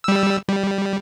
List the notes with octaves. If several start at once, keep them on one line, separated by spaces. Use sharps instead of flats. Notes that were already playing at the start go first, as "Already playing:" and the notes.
G3 E6
G3